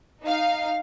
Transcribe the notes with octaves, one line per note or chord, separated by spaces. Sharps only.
D#4 F5